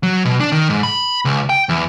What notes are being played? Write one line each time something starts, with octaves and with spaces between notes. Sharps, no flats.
F#3
B2
D4
D#3
G#2
B5
C#2
G5
E2